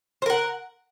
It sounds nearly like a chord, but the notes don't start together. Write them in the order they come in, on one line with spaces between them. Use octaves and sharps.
C5 A#4 F#5